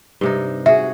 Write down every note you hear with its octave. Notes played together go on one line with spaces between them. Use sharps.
G2 C3 D#4
F#4 G#4 E5